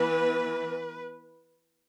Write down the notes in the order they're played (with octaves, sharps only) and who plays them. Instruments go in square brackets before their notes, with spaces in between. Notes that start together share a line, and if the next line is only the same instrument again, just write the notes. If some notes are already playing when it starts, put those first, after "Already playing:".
Already playing: [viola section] E3 B3 B4